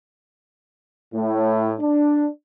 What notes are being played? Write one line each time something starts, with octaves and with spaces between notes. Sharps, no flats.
A2
D4